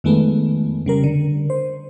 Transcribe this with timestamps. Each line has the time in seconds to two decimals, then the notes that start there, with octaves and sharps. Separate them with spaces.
0.04 F2 D#3 G#3 A3 B3
0.86 C#3 G3 A#4
1.04 D3
1.50 C5